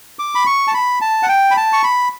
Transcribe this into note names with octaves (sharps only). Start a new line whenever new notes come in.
D6
B5
C#6
A5
B5
A5
F#5
G5
B5
A5
C#6
B5